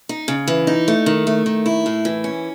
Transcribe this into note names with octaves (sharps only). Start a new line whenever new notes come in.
D#4
C#3
E3
D#4
A3
D#3
A3
D#3
E4
A2
E3
C#4